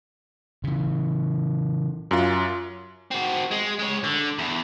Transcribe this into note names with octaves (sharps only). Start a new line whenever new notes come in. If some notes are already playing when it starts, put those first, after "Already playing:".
C#3 E3
F#2 F4
C4 F#4
G#3
G#3 C#5
D3
E2